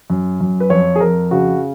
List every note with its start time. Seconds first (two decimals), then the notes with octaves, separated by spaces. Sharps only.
0.10 F#2
0.40 F#2
0.60 B4
0.70 F2 C#5
0.96 G#4
1.00 F2 A#4
1.31 C#3 F#4